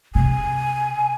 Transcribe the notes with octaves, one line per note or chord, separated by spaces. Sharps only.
C3 G#5